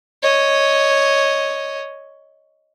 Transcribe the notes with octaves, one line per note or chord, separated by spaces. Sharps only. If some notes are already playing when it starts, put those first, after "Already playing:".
C#5 D#5